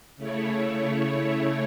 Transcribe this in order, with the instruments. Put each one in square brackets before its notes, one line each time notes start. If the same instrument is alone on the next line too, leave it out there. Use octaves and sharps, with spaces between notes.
[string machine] C#3 A3 E4 C#5